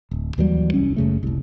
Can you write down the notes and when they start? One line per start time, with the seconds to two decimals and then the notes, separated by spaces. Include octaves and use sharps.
0.11 D1
0.38 D#2 E3 F#3 G3
0.74 F1 C2 C#4
0.97 F#1 C#3 A3
1.23 F1 C2